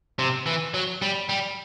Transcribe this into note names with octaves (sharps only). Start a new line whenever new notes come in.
C3
E3
F#3
G3
G3